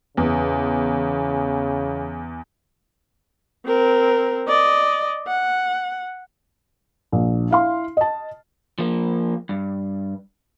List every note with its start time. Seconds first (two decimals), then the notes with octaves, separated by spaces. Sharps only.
0.17 E2 C#3
3.66 C4 A#4
4.48 D5 D#5
5.27 F#5
7.12 A#1
7.51 E4 F5 C6
7.97 D#5 A5
8.79 F3 A#3
9.49 G2